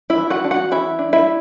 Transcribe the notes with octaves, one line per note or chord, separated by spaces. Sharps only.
E4 E5
E3
F#4 F#5
D4
F#4 F#5
E3 E4 E5
D4
E4 E5